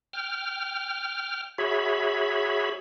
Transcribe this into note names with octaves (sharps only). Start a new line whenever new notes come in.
G5 F6
F#4 G#4 C#5 E5 B5